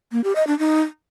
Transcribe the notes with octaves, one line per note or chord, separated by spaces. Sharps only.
A#3
G4
D#5
D4
D#4